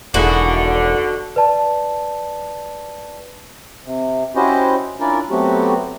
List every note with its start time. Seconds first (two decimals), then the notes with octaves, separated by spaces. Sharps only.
0.14 E1 D3 D#3 E4 F#4 G#4
1.36 B4 D5 A5
3.84 C3
4.36 C#4 E4 F#4 G4 C5 D#5
5.00 C#4 D4 E4 F4 A#4 D5
5.30 F#3 A3 B3 C4 F#4 G4